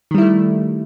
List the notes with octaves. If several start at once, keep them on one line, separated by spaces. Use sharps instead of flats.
D#3 G3 A3 E4